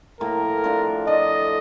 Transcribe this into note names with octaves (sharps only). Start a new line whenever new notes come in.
A2 F3 A#3 A#4
F3 A3 D4 F4
F3 A3 D4 A4 D#5